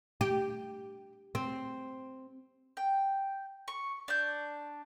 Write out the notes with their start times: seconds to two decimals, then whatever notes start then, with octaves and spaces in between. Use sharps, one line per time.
0.21 G4
1.35 C4
2.77 G5
3.68 C#6
4.08 D4 G6